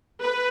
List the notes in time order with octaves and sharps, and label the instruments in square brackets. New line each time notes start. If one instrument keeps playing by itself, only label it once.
[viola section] B4